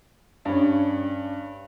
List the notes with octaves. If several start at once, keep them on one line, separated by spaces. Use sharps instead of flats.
G2 C#4